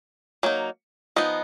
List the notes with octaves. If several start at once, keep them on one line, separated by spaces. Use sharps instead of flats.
F#3 A#3 D#4
F3 B3 D#4 D#5